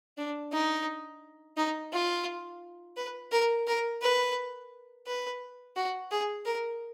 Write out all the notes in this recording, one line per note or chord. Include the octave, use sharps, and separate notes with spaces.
D4
D#4
D#4
F4
B4
A#4
A#4
B4
B4
F#4
G#4
A#4